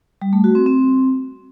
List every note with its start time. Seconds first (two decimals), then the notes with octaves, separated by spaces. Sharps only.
0.22 G3
0.33 A3
0.44 F#4
0.55 C4
0.66 C4